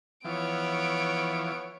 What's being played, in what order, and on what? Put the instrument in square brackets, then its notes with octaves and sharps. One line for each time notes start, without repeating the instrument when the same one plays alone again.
[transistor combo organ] E3 F3 [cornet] B3 [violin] C#5 D7